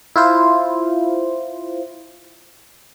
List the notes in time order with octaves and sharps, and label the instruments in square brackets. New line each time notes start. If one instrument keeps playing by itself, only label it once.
[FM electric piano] E4 F4 C5